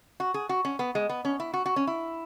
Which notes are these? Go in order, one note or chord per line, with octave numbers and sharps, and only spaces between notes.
F#4
G#4
F#4
C#4
B3
G#3
B3
C#4
E4
F#4
F#4
C#4
E4